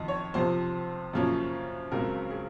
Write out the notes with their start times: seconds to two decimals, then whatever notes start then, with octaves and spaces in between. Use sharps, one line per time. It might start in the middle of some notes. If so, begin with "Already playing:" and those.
Already playing: F2 D#3 D#5
0.08 C#5
0.34 F2 C3 F3 C5
1.13 F#2 C#3 F3 A#3 C#4
1.92 C#2 C#3 F#3 C4 A#4
2.30 G#4